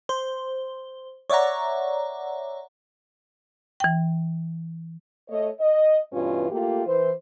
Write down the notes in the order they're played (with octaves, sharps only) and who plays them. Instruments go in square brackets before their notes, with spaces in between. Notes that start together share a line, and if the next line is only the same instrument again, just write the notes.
[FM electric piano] C5
C#5 D5 E5 F#5 A#5
[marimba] E3 G5
[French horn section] A3 C#5 D#5
D#5
G2 B2 E3 C#4 F4
A3 A#3 F4 G4
E3 C5